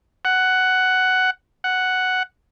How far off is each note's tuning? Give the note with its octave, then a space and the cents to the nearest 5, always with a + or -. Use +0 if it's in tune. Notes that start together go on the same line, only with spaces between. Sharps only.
F#5 +10
F#5 +5